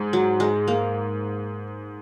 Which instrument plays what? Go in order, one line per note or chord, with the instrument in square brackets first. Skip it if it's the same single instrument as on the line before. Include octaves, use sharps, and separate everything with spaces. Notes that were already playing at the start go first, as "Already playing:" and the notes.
Already playing: [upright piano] G#2
[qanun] F#3
G#3
A#3